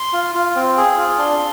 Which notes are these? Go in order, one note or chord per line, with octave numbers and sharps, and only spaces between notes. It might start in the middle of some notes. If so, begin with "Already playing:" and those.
Already playing: C6
F4
F4
C4
G#4
F4
D4 C6